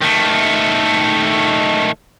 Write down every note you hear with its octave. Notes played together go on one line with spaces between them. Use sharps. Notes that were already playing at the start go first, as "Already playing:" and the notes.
D#3 A3